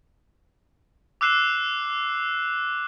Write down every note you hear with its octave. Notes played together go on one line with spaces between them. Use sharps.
D6 E6 F#6 C7 E7